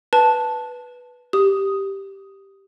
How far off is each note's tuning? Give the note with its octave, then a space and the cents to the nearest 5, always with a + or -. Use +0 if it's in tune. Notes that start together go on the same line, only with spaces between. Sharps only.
B4 -5 A5 +0
G4 +0 D#6 +0